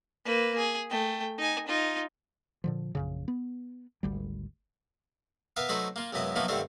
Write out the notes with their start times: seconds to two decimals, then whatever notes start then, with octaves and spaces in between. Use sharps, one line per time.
0.25 A#3 B4
0.57 G#4
0.90 A3 G5
1.38 D#4 G#5
1.67 D#4 F4
2.64 A#2 D3 F3
2.95 A#1 F#2 C#3
3.28 B3
4.03 G#1 D2 G3
5.56 B3 A#4 B4 E5 F5
5.69 F#3 A3 D#4 E4 B4 C5
5.96 A#3 F4
6.13 C#2 F#2 F#3 B3 E4 D#5
6.36 F3 F#3 A#3 B3 D#4 E4
6.48 G2 D3 D#3 A3 C4 C5